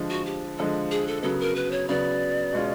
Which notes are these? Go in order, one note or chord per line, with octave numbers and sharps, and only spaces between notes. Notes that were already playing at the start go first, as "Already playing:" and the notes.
Already playing: D3 F3 G#3
F#4
G4
D3 F3 G#3 A4
G#4
A4
C#3 F#3 B3 A4
A#4
B4
C#5
C#3 F#3 B3 D5
B2 G#3 C#4 F4